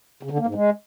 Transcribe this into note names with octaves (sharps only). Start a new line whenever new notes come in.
C#3
D3
A#3
G#2
G#3